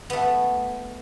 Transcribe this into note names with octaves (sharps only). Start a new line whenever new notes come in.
A3 B3